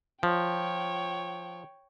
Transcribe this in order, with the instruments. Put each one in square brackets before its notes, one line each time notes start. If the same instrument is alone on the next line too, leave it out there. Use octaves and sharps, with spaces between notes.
[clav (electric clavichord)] F3 [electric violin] C#5 G5